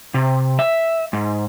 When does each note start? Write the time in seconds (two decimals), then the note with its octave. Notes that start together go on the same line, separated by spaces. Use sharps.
0.14 C3
0.59 E5
1.13 G#2